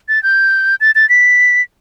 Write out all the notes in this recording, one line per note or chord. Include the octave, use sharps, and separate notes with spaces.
A6
G6
A6
A6
B6